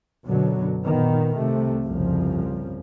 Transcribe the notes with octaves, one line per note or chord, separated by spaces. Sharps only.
F#2 B2 D3 F#3
A#2 D#3 B3
C2 C3 A3
G1 C2 F2 C#3 F3